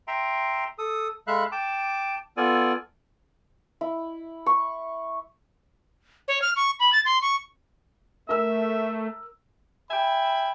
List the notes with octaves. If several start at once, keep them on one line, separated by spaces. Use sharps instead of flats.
E5 G5 A#5 C6
A4 D#6
G#3 A4 E5 F5 B5 F#6
G5 A5 D6
B3 F4 A4 D5 G#5
E4
C#6
C#5
F6
C#6
B5
A6
C6
C#6
A3 A#4 E5 E6
E5 G5 G#5 B5